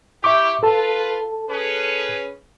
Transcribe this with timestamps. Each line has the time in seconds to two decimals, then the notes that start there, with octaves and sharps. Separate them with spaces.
0.24 E4 G4 E5 C#6 D6
0.63 F4 A4 B4 A5
1.50 C#4 G#4 B4